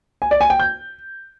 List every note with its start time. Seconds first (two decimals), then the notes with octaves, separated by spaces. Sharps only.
0.22 G#5
0.31 D5
0.41 G#5
0.50 G5
0.60 G6